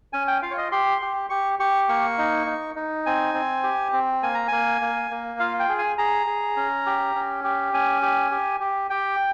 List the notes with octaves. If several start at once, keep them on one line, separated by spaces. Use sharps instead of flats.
C#4 G#5
G5
F4 F5
C#5
D#5
G4 C6
G4
G4 C#6
G4 C#6
A#3 C#6
D#4
D#4
D#4
C4 G#5
C4
G4
C4
A#3 G#5
A#5
A#3 G#5
A#3
A#3
F4 F5
G5
G#4
G#5
G#4 A#5
G#4
C#4
G4
C#4
G4
C#4 G#5
G4
G4
G4
G4 G5